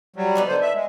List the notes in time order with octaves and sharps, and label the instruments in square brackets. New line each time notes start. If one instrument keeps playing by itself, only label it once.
[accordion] F#3 G3
[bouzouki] B3 D4 D#4
[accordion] D3 C5
E5
G#3